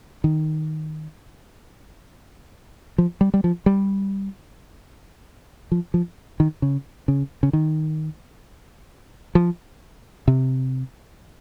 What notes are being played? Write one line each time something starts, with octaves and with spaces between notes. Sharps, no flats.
D#3
F3
G3
G3
F3
G3
F3
F3
D#3
C#3
C#3
C#3
D#3
F3
C3